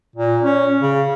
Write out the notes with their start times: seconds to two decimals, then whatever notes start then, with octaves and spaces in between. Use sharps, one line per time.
0.16 A#2
0.43 C#4
0.82 C#3